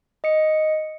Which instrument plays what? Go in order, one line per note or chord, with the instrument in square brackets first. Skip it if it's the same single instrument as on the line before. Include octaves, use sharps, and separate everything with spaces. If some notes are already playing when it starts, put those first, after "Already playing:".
[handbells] D#5 C#7